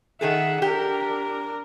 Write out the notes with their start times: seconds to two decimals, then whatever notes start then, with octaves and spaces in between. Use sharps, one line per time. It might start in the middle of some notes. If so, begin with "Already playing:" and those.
0.21 D#3 G#4 A4 E5 F#5
0.62 D4 G4 A#4